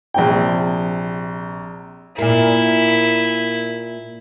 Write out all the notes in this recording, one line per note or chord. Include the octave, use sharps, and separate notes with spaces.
A#1 C3 G5
A#2 A#3 E4